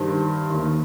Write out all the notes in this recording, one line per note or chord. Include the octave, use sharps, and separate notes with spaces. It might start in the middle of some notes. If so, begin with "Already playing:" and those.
Already playing: G2 D#3 C5
D#2 D#3